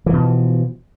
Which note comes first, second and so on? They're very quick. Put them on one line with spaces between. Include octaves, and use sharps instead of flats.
E3 F3 B2